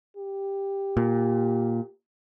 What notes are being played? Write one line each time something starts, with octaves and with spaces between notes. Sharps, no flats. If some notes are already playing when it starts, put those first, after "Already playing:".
G4
A#2